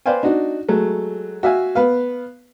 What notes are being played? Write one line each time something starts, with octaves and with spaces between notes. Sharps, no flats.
B4 C5 D5 F5 G5 G#5
D4 D#4 F#4
F#3 G#3 A3
F#4 E5 F5 G#5
B3 B4 F5